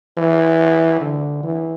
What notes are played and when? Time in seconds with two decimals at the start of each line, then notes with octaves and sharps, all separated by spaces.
0.17 E3
1.01 D3
1.43 E3